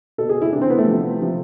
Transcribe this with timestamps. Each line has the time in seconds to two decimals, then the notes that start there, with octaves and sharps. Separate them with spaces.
0.18 B2 A4
0.29 G#4
0.42 E4
0.53 C3 E3 D4
0.62 C4
0.70 B3
0.78 A3
0.88 C3 F3
1.22 C3 F3